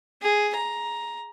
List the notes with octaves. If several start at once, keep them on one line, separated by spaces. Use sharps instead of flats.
G#4
A#5